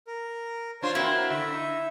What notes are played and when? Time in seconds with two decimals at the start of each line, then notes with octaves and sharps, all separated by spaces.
0.07 A#4
0.82 D4 F4 C5 C#5
0.95 A#3 C4 E4 F#4
1.30 D3 E5
1.52 D#4